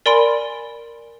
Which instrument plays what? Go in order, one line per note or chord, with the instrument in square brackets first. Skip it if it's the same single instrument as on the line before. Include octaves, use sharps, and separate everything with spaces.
[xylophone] A#4 D5 G#5 B5 C6 D7